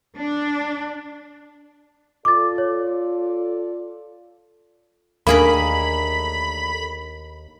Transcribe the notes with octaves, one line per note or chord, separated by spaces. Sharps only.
D4
F4 A4 D5 D6 A6
C#5
D#2 D3 A3 A#3 G#4 A#4 B5